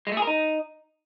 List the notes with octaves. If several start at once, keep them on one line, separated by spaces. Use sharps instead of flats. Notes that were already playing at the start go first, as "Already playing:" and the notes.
G#3
A3
G#4
A#4
D#4